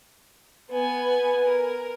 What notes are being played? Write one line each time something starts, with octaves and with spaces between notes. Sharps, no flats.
B3 B4 G#5
A#4